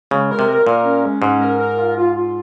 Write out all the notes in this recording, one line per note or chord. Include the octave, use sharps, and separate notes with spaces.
C#3 G#3
A#4
C3
A#4
A#2 A#4
C#4
G#3
G#2 C#4
A#4
A#4
F4
F4
F4